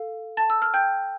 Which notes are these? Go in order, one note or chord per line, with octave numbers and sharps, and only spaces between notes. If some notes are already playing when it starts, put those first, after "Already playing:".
Already playing: A4 F5
A5 A6
E6
F6
G5 G6